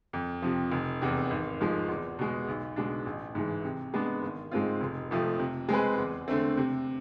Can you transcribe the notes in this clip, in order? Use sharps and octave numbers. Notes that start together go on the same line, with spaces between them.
F2
C3 F3
F1
E2 C3
G#1
G#2 F3 G#3
E2
B2 G#3
B1
B2 G#3 D4
A1
G#2 E3 G#3
C3
G#3 B3 D4
G#1
G#2 G#3 C4 F4
F1
F2 C3 F3 A3
C3
G#3 C4 G#4 B4
E2
D3 A3 C4
C3